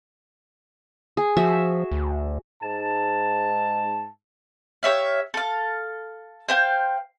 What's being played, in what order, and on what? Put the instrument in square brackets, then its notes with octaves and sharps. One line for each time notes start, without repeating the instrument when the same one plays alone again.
[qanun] G#4
[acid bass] F3 [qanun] F#4 E5
[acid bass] D2
[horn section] G#2 A5
[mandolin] G4 C#5 E5 F5
A4 F5
C5 F5 G5